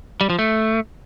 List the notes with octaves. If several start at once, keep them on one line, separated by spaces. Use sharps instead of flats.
G3
F3
A3